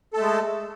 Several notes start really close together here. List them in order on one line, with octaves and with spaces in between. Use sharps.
A4 A3 G#3